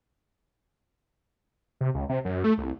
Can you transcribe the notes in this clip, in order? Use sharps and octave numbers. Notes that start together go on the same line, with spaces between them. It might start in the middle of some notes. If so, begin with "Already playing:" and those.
C3
C#2
C3
F#2
A3
C2